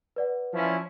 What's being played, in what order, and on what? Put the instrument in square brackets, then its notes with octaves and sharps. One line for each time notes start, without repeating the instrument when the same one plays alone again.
[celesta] B4 D5 F#5
[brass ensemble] F3 C#4 E4